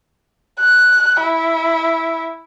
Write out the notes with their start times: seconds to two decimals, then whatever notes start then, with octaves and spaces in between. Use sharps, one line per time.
0.60 F#6
1.20 E4